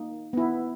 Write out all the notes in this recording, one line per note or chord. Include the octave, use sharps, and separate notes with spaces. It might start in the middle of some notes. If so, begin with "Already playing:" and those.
Already playing: A#3 D#4
B3 E4